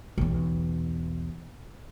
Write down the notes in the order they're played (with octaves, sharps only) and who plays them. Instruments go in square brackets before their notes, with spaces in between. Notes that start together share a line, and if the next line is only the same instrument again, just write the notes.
[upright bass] B1 E2